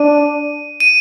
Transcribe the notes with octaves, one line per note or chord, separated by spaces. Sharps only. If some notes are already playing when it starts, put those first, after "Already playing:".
Already playing: D4 D#7
D#7